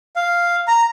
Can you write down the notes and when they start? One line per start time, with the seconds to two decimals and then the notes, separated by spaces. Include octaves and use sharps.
0.16 F5
0.68 A#5